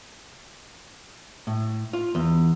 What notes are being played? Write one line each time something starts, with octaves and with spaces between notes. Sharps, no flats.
A2
F4
E2